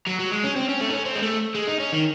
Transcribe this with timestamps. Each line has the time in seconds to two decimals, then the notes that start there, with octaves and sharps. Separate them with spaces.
0.07 F#3
0.19 F#3
0.31 G#3
0.44 C#4
0.56 C4
0.69 C#4
0.81 A3
0.89 D#4
0.93 C#4
1.05 C4
1.15 G#3
1.23 A3
1.55 G#3
1.68 D#4
1.80 C#4
1.92 D#3